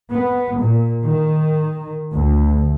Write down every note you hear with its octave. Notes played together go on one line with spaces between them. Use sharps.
B3
A#2
D#3
D2